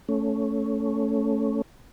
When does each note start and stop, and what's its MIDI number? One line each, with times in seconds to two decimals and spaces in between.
0.09 1.62 57
0.09 1.62 61